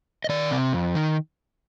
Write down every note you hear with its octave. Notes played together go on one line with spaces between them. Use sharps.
D#5
D#3 D5
C3
F2
D#3